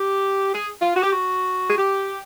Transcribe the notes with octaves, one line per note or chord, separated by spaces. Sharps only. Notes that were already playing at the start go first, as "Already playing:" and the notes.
Already playing: G4
G#4
F4
F#4
G4
F#4
G#4
G4